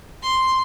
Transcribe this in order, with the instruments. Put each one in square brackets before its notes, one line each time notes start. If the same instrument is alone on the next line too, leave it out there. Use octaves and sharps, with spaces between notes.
[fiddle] C6